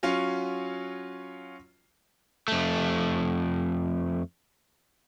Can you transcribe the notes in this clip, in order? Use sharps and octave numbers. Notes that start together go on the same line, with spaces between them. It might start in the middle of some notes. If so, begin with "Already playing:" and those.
F#3 C#4 F4
F2 A3